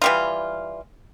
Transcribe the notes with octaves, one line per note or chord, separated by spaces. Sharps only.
E3 G3 F4